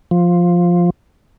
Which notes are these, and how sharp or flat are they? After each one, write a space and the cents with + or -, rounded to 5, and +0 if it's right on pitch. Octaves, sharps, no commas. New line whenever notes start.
F3 +5